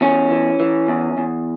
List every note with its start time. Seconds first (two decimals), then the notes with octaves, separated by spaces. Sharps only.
0.01 E2 C#4
0.31 E3
0.60 E3
0.88 E2
1.18 E2